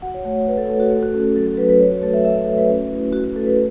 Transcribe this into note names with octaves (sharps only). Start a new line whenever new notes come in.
F#4 F#5
C#5
A3 C#5
C#5
F#4 B4
A4
A3 A4
F#4
A3 A4
F#4
C#4 A4
F#4
F#3 A4
A4
F#3 B4
B4
F#4 C#5
F#4
A3 A4
E5
F#4 E5
E5
A3 A4
B4
C#4
E4
A3 F#4
F#4
A3 A4
B4